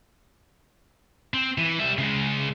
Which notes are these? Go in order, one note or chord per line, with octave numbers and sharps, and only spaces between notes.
C4
E3
G3 E5
C#3 G#3